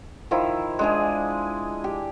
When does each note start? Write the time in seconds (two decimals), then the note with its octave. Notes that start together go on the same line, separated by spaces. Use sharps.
0.31 D#3 F3 E4
0.79 G#3 D4 G#4
1.84 G4